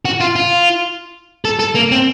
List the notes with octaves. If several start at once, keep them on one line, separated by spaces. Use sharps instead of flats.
F#4
F4
F4
A4
A4
A#3
C4